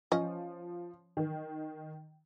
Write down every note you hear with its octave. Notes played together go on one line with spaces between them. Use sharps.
F3 C#4 D#5
D#3